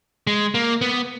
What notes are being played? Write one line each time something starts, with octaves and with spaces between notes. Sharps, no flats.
G#3
A#3
B3